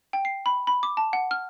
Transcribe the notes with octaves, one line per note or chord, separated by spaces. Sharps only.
G5
C7
B5
B5
D6
A5
F#5
F6